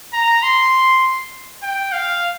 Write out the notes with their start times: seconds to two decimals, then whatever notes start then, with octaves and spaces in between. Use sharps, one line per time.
0.13 A#5
0.43 C6
1.62 G5
1.92 F5